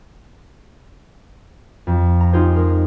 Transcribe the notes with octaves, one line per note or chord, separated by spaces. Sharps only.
F2
A#5
D#4 F4 G4 G#4 C5
G#3 A#4